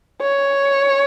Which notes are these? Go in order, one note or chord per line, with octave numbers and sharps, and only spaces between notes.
C#5